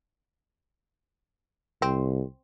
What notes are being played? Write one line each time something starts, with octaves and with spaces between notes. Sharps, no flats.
C2 C4